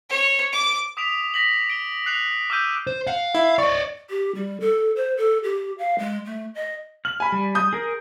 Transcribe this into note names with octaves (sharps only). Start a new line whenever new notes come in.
C#5
D6
D6 D#6 B6 D7 F7
A#6 B6 F#7
D7 G7
F#6 C7 F7
D6 E6 F6 G6 D#7
C5
F5 F#5
E4
D5 D#5 C#6
G4
G3
A4
C5
A4
G4
F5
G#3
A3
D#5
F6 F#7
G#5 B5
G3
D#6 G6
G#4 A#4